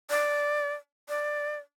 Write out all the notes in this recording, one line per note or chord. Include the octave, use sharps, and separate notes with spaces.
D5
D5